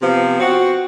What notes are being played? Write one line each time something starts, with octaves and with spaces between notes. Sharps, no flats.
C3 F3 B3
C4 F#4